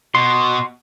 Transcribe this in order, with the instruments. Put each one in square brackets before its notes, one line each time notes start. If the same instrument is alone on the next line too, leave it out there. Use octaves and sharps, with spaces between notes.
[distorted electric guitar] B2 [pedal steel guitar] C6